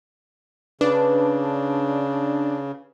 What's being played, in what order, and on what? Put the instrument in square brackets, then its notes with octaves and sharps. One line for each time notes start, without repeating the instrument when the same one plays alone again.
[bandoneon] C#3 [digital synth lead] D4 [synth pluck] B4